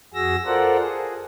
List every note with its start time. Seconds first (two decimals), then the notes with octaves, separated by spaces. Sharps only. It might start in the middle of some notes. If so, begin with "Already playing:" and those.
0.14 F2 F#4 G#4 E6 A#6
0.46 F4 A4 A#4 C5 D5 F#5
0.79 G#4